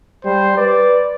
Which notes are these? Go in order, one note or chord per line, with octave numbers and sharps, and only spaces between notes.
G3 C5
B4 D5